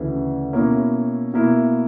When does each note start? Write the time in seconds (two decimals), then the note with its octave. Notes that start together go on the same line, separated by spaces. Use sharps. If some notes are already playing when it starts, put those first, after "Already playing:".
Already playing: D2 C#3 E3
0.53 B2 A#3 C#4 E4
1.34 B2 A#3 E4